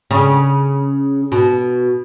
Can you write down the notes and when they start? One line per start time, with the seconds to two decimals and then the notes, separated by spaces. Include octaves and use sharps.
0.11 C#3
1.32 B2